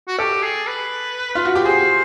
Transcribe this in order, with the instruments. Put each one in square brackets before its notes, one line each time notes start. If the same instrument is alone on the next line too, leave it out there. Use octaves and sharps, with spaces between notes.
[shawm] F#4
[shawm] G4 [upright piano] A4
[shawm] G#4
B4
[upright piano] F4
F#4
G4
[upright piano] G#4 [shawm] C5